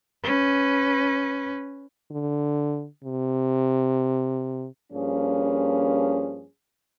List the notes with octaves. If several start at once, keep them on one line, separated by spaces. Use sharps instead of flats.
C#4 B4
D3
C3
G2 F3 A#3 C#4 G#4